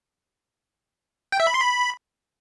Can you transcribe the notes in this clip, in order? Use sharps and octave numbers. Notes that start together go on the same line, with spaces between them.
G5
E5
B5
C6
B5